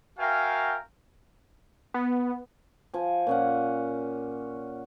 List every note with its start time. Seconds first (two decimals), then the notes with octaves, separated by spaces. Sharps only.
0.19 F#4 A#4 E5 F5 G5 G#5
1.94 B3
2.94 F3 G#5
3.27 A#2 C#4 F#5